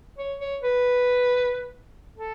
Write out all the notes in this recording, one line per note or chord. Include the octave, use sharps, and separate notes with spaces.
C#5
C#5
B4
A4